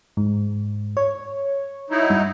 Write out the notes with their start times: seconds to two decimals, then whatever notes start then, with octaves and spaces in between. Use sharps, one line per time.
0.17 G#2
0.97 C#5
1.90 F#3 D#4 E4
2.10 G2